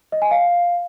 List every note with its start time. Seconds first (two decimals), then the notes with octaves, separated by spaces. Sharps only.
0.12 D#5
0.22 G#5
0.31 F5